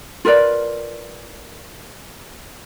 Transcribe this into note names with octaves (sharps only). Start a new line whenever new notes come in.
F4 A#4 B4 D5